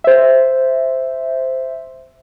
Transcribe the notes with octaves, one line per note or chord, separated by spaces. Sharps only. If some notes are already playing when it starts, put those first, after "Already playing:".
C5 E5